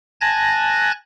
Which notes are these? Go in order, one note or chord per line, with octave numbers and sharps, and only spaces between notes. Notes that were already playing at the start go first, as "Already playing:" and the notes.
G#5 A5 F#6 G#6 A#6